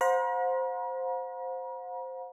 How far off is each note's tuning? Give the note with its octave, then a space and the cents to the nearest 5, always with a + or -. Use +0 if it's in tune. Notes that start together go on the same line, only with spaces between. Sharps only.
C5 +0 F#5 -45 A#5 +45